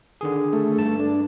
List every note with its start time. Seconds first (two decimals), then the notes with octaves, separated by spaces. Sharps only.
0.21 D3 D#3 G#4
0.53 A3
0.78 G2 A5
1.00 D4